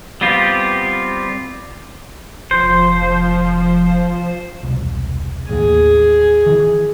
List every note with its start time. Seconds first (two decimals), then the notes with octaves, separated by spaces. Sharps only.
0.21 G3 B3 C4 F4 G4
2.51 F1 F3 C5
4.63 E1 C2
5.49 A1 D#2 G#4
6.46 D#3 E3